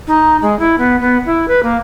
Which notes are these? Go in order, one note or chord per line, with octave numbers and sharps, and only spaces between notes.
D#4
G#3
E4
B3
B3
E4
B4
A#3